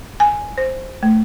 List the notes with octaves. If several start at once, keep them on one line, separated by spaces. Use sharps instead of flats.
G#5
C5
A3